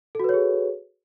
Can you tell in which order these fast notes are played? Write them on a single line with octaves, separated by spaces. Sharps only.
A4 F#4 B4 C#5 G#4